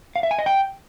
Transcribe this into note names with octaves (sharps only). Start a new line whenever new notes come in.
F5
E5
G#5
D#5
G5